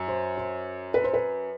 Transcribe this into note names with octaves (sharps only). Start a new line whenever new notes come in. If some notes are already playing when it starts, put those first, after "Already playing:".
Already playing: F#2
C5
C5
B4
C5
B4